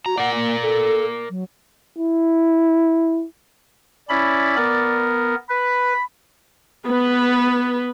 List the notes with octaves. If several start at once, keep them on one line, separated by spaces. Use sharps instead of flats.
F#4 A#5
A#4 D5 F#5
A#3
A4
F#3
E4
C#4 E4 D5 B5
B3 A#4
B4 B5
B3 B4